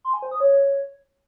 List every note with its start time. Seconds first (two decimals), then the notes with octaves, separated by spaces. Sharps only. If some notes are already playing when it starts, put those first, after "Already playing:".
0.05 C6
0.13 G#5
0.22 C5
0.31 D#6
0.40 C#5